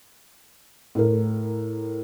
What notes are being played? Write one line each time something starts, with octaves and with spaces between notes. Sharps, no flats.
A2 A#4